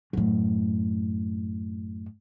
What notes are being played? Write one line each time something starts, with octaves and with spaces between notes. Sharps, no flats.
F#2 A2